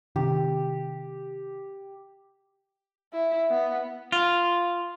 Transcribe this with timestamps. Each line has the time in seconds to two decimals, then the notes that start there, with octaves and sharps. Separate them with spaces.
0.16 C3 D#3 G4
3.13 E4
3.50 B3
4.12 F4